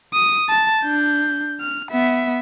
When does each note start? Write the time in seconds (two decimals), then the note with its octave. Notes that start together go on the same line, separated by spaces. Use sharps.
0.14 D#6
0.50 A5
0.83 D4 G6
1.61 F6
1.91 B3 E5